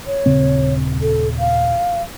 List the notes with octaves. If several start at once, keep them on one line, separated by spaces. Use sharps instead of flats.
C#5
D#1 C#3 C4
A4
F5